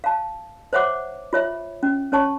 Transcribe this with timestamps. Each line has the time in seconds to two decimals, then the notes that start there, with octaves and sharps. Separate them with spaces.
0.04 F5 A5
0.73 C5 C#5 E5 F#5 D6
1.33 F4 C#5 E5
1.83 C#4
2.12 C#4 C#5 A5 C#6